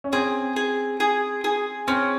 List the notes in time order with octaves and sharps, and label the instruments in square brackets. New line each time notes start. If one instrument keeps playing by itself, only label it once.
[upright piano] C#4
[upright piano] C4 [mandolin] G#4
[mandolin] G#4
G#4
G#4
[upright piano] C4 [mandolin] C#4